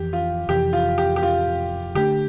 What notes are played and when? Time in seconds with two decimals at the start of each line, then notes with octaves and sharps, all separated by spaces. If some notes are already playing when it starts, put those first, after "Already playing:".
Already playing: F2 E3 G4
0.13 F4
0.49 F2 C3 E3 G4
0.73 F4
0.98 G4
1.16 G4
1.23 F4
1.95 D3 A3 D4 G4